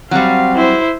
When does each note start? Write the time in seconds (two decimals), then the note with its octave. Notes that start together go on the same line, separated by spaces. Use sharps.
0.11 F#3 G3 C4 F5
0.55 E4 C5